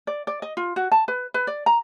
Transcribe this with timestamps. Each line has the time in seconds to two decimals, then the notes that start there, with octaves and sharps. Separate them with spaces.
0.07 D5
0.27 D5
0.42 D#5
0.57 F4
0.76 F#4
0.92 A5
1.08 B4
1.34 B4
1.47 D5
1.66 A#5